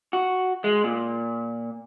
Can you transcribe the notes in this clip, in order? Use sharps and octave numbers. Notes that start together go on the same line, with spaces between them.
F#4
G#3
A#2